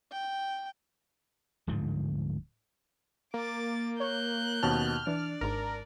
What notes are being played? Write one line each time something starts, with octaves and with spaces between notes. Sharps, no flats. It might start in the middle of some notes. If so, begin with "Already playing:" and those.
G5
D1 G#2 D3 F3
A#3 D6 A6
C#5 F#6 G6
D#2 B2 C4 C#4 A5 F6
E3 D4 D5
G#1 G#2 A#4 A#5